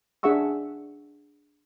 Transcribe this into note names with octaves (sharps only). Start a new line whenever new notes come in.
D4 G#4 E5 F#5 C#6 E6